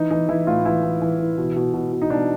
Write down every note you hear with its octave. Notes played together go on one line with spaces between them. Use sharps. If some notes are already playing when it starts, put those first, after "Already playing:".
Already playing: E3 D#4
E3 D#4
E3 E4
A2 F4
E3 E4
E3
E3
E3
B2
B2
B2
B2
D#4
B2 D4